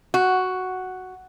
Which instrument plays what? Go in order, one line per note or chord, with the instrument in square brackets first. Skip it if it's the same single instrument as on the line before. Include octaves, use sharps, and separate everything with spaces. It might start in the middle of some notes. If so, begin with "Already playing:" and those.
[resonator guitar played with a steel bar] F#4